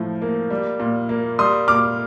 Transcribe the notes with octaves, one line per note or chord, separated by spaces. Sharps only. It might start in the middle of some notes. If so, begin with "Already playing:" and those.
Already playing: A2 F3
A#3
G3
A#2
A#3
G3 C6 D#6
A#2 D6 F6